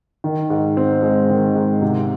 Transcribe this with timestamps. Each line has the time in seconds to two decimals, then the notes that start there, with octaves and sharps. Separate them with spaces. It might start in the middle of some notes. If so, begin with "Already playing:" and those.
0.24 D#3
0.50 G#2
0.77 C4
1.02 G#3
1.29 D#3
1.55 G#2
1.82 C3